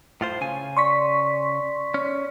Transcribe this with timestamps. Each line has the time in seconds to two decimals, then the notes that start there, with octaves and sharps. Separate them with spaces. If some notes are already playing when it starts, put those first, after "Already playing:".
0.21 A2 F4 C5
0.41 C#3 G#5
0.77 D5 C6 C#6 B6
1.94 C#4